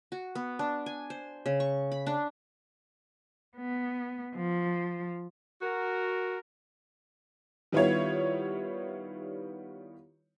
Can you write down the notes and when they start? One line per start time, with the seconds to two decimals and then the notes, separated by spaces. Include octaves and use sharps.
0.12 F#4
0.35 B3
0.59 D4
0.86 G#5
1.10 C5
1.46 C#3
1.60 C#6
1.92 B5
2.06 D4
3.57 B3
4.36 F3
5.62 F#4 A#4
7.72 D#3 G3 B3 E4 F4 C#5